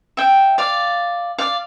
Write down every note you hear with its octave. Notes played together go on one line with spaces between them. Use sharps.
E5 G5
D5 F5
D5 F5